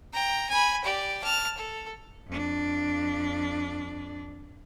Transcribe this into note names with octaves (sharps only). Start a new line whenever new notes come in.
G5 A#5
G#5 B5
G4 D5
A5 F6
A4
F2 D4